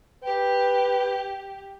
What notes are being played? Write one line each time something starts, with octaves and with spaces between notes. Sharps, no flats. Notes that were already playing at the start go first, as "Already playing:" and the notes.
G4 B4